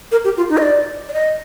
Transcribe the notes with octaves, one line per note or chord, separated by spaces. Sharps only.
A#4
G4
F4
D#4
D#5
D5
D5
D#5